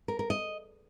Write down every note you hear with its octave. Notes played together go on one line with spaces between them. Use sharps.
A#4
A#4
D#5